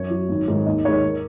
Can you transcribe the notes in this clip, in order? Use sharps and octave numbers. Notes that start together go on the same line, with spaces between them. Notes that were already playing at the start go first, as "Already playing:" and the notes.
Already playing: F#2 C#5
F#3
G#1
G#2 D#3 G#3
D#2 D#5
D#3 G#3 C#5
A#4